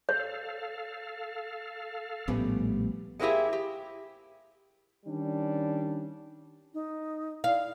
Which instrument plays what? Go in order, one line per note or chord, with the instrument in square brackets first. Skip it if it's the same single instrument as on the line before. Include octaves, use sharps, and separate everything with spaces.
[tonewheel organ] A4 F5 [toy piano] C#5
[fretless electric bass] A#1 A2 B3 [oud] G3 A3 C#4
[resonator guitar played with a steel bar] G#3 A#3 C4 E4 G4 G#4
G4
[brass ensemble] D#3 G3 C#4 D4
[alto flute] D#4
[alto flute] E4 [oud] F5